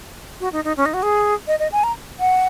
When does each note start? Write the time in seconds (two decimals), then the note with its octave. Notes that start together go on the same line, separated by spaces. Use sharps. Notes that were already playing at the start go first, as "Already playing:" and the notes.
0.40 F#4
0.52 D#4
0.64 D#4
0.77 C#4
0.86 D#4
0.94 F#4
1.03 G#4
1.48 D#5
1.59 D#5
1.72 G#5
1.84 A#5
2.20 F#5